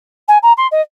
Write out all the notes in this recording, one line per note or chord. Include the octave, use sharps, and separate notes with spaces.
G#5
A#5
C6
D#5